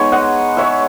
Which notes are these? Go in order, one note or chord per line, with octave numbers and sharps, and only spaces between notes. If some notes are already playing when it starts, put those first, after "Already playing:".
Already playing: G#3 B3 D#4 C#5
D#5 F#5
C#5 E5